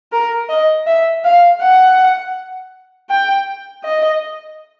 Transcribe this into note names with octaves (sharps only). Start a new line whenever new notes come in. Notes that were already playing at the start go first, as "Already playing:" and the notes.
A#4
D#5
E5
F5
F#5
G5
D#5